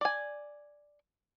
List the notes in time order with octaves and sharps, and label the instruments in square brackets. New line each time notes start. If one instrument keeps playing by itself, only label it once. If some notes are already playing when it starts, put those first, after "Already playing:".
[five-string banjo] D5 G#5